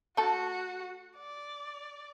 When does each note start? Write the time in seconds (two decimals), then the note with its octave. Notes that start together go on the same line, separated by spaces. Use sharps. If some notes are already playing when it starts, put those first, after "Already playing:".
0.17 A3 F#4 A4
1.17 D5